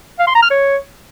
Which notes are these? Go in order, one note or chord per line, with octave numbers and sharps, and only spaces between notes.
F5
C6
A#5
F6
C#5